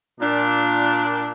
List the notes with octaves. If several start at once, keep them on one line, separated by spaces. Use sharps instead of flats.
A#2 D4